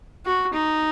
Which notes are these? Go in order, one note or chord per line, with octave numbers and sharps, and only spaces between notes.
F#4
D#4